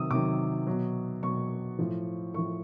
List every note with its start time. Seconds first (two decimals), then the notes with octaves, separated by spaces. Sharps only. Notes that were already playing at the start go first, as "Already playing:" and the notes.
Already playing: C3 D#3 F#3 D#6 E6
0.11 C3 D#3 F#3 D6
0.67 B2 F#3
1.22 B2 F#3 C#6
1.79 A2 F3
2.34 A2 F3 C#6